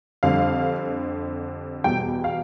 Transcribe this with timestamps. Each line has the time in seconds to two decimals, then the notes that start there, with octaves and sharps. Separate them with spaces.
0.23 F2 D3 G3 F5
1.84 E2 B2 G3 G5
2.24 F5